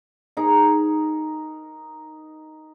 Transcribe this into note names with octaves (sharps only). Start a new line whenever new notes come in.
D#4 G#4 A#4